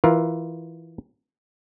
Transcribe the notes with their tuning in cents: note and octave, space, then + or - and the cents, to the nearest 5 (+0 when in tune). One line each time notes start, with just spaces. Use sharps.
E3 +0 F4 +0 A#4 +15